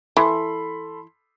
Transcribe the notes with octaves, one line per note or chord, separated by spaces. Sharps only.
E3 A4 B5 C6